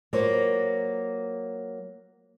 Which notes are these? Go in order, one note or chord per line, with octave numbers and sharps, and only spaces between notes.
F#3 A#3 F4 B4 C5 D5